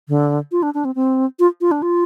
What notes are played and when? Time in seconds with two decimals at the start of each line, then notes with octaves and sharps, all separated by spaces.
0.08 D3
0.52 F4
0.63 D4
0.74 D4
0.85 C4
0.95 C4
1.39 F4
1.61 F4
1.71 D4
1.82 F4